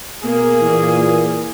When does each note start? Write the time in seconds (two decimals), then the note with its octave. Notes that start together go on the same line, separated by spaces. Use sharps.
0.23 B2 A#3 G#4
0.61 A#2 E3